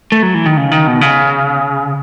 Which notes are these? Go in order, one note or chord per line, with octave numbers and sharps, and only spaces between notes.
A3
F#3
E3
D#3
C#3
D#3
B2
C#3